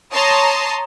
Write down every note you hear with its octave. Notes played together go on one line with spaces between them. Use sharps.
C#5 A5 A#5 C6 D#6